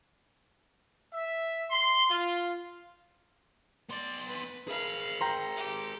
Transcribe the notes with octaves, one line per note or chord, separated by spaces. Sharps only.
E5
C6
F4
B3 D5 C6
B4
G#4 A#4 F5 B5
G5 A#5 C6
G4